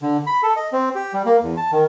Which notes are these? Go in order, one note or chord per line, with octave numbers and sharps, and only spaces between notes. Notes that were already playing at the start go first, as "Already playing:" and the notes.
D3
B5
A4
D#5
C4
G4
G3
A#3
E2
A5
D#3